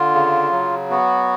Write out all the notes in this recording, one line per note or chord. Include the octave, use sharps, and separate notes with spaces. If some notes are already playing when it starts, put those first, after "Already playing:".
Already playing: D3 F4
C#3
F#3
B3 F#4